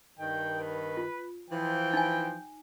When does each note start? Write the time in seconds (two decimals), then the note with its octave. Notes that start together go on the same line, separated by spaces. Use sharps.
0.20 G2 D#3 G5
0.61 B4
0.97 F4
1.51 E3 F3 G5
1.93 D#4 G#5